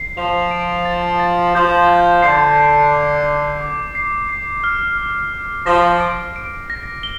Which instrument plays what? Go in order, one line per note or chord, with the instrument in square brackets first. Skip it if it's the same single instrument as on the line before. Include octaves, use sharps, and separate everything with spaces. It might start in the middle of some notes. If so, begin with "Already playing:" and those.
Already playing: [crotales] C7
[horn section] F3 [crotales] F7
[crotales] D7
A6
A6
[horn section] F3 [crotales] G6
[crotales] G6
[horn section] D3 [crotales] C7
[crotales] G6
D6
G6
D6
C7
C7
F6
F6
F6
[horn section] F3 [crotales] A#6
[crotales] D7
D7
A#6
G7